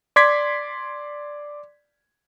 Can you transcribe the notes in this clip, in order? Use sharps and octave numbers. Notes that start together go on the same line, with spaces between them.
D5 C6 D6 G#6 B6